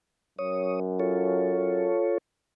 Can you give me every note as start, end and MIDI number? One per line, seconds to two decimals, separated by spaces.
0.39 1.92 42
0.39 0.80 73
0.39 0.80 87
1.00 2.18 65
1.00 2.18 69
1.00 2.18 73